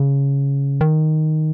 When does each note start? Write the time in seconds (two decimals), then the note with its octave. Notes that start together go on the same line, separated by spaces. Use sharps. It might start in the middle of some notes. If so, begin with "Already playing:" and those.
Already playing: C#3
0.81 D#3